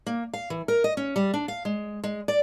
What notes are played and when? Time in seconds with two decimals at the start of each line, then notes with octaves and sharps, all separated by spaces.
0.07 A#3
0.34 F5
0.50 E3
0.68 A#4
0.84 D#5
0.97 C#4
1.16 G3
1.34 D4
1.48 F5
1.65 G#3
2.04 G#3
2.28 D5